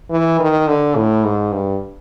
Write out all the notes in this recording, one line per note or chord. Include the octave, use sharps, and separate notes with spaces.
E3
D#3
D3
A2
G#2
G2